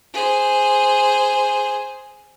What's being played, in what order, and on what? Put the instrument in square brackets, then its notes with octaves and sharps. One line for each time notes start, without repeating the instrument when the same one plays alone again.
[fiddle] G#4 C5